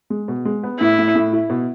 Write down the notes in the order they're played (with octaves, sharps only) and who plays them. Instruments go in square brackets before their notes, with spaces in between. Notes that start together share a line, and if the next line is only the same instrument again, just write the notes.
[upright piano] G#3
B2
G#3
B3
[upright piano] A2 [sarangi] E4
[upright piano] A2
A2
E4
B2